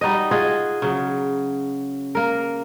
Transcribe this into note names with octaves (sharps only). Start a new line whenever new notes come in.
G3 D#4 F#4 D#5
F4 F#4 G#4 D#5
C#3 F#3
A#3 A#4